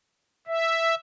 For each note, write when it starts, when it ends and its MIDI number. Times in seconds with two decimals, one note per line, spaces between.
0.47 0.95 76